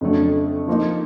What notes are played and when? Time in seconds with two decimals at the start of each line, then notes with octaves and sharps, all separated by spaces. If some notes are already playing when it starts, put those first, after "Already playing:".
0.01 F2 C#3 F#3 A3 D4
0.68 F3 A#3 D#4